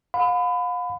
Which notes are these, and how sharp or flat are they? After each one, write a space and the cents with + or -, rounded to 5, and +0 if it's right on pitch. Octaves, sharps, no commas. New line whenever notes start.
F5 +40 B5 +25